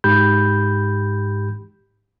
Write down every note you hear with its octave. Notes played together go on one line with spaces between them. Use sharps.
G#2 G4 B5 G6